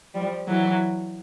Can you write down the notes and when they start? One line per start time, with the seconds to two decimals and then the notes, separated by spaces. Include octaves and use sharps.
0.14 F3 G3
0.48 E3 F#3